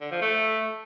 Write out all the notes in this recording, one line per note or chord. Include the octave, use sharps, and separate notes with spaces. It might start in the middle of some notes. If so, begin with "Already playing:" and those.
D3
F3
A3